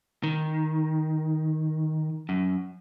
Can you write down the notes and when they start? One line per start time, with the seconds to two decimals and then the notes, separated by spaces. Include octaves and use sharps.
0.23 D#3
2.29 F#2